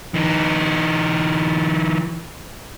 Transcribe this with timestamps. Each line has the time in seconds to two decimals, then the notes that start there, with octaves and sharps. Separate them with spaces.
0.14 E3 D#4